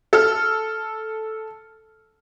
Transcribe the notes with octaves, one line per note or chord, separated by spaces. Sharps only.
A4 F6